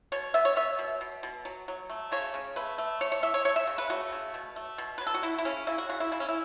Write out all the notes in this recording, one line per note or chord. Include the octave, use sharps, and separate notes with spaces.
B2 C#5
B3 E5
C#5
B3 E5
B2
B2
B2
F#3
F#3
A3
C#3 C#5
C#3
A3 B4
A3
A3 C#5
C#5
E3 E5
C#5
A3 C#5
E5
C#3
B4
A3 F#4
C#3
B2
A3
B2
F#3 B4
A4
F#4
F#3 E4
E4
C#3 C#4
C#3 E4
F#4
C#3 F#4
E4
C#3 E4
C#4
E4